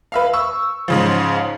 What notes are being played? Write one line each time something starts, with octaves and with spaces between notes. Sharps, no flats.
B4 E5 F5
C#6 E6
G#2 C#3 F3